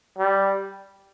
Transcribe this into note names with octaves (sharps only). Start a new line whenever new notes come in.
G3